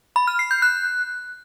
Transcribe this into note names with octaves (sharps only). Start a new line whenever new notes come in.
B5
F6
C7
G6
F#6